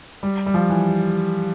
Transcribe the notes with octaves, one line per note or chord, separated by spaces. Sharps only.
G3
G3
F3
E3